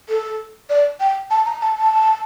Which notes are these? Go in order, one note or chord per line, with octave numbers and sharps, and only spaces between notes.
A4
D5
G5
A5
A#5
A5
A5